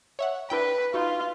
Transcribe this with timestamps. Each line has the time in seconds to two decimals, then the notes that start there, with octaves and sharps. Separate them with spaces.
0.19 C#5 E5 F#5
0.50 D4 E4 B4 G5
0.94 D#4 F4 F#4